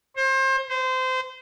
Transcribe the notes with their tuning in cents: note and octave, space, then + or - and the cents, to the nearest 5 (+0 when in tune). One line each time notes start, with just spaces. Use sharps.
C5 +30
C5 -25